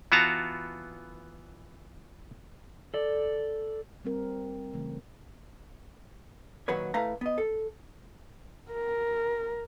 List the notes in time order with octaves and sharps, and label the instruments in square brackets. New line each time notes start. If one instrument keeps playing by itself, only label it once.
[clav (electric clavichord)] E3 B3 F4 F#4 A5 A#5
[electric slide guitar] A4 D5
[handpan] G3 C4 A#4
C#3 E3 A3
[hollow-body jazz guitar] A#2 D#3 F#3 F#4 B4 C#5
A2 A3 B4 F5 A#5
B3 D#5
A4
[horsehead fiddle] A#4